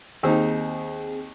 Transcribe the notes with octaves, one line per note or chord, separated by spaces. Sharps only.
D#2 C4 D#4 G#4